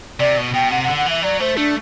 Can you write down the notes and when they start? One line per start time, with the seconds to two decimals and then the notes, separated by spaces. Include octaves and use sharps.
0.20 C3 D5
0.37 B2
0.54 B2 G5
0.71 C3 F#5
0.84 D3 F#5
0.97 F#5
1.06 E3 E5
1.23 F#3 D5
1.40 A3 C5
1.57 A3 D4